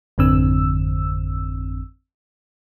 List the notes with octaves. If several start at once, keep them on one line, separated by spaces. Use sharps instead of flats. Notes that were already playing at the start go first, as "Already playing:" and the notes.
G#1 F2 D3 C4 E6